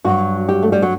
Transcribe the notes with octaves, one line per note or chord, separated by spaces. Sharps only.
G2 F#3 F#4
G4
A3
G3
F#3